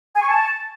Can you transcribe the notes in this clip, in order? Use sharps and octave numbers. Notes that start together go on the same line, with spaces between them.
G#5
C#6
A5